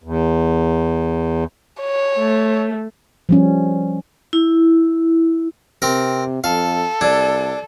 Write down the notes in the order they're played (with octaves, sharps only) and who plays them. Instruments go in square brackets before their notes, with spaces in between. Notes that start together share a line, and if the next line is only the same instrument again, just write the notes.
[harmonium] E2
[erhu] C#5
[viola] A3
[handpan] F3 G3 C#4
[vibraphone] E4
[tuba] C3 [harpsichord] C4 A#4
[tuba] F2 [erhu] A4 [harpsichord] F5
[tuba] C2 [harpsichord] D4 [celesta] D5 E6 G#6